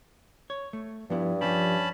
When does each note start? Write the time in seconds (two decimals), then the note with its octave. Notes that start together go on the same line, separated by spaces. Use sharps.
0.50 C#5
0.73 A3
1.10 G2 F3 B3 E4
1.41 F3 C#4 G4 A5 B5